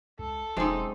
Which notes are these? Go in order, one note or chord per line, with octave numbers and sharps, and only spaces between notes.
C#2 A4
E1 F#2 G#3 C4 D#4 D#5